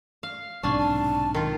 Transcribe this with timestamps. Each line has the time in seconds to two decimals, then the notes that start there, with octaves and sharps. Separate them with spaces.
0.23 F5
0.63 B1 G#2 C3 D4 F5 G#5 C#6
0.78 A5
1.34 D#3 F4